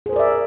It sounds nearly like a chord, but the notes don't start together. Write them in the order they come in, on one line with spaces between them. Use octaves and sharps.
G#4 C5 A#4 D5 E5